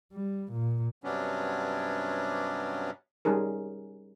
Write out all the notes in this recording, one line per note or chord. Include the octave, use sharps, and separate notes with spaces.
G3
A#2
G2 C3 F#3 B3 C#4 D4
G3 C#4 D#4 G#4 A#4